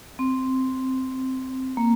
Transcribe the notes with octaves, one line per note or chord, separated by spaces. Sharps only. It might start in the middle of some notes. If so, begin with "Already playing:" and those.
C4
A#3